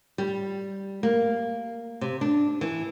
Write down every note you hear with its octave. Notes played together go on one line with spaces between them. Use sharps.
G3
A#3
C3
D4
E3